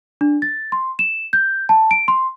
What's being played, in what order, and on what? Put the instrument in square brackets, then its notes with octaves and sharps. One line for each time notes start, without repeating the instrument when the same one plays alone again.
[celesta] D4
A6
C6
E7
G6
A5
D7
C6